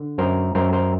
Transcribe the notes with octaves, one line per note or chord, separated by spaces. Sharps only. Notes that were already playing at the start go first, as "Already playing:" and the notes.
Already playing: D3
F#2 A#4 C5
F#2 A#4 C5
A#4 C5